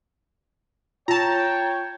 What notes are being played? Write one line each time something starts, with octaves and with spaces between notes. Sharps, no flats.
F4 C#5 G5 A5 A#5